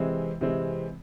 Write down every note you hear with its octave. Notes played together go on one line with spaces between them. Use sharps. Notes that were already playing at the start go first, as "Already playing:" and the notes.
Already playing: C3 E3 G#3 C4
C3 E3 G#3 C4